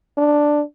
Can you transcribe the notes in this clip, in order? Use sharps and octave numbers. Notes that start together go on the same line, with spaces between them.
D4